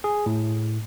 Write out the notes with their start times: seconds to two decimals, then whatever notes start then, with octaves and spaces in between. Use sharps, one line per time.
0.04 G#4
0.26 A2